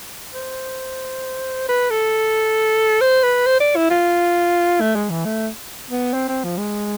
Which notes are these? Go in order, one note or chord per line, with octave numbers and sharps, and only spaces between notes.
C5
B4
A4
C5
B4
C5
D5
E4
F4
A3
G#3
E3
A3
B3
C4
C4
F3
G#3